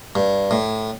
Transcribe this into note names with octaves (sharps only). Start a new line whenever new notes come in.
G2
A2